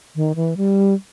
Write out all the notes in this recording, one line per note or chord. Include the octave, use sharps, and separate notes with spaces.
D#3
E3
G3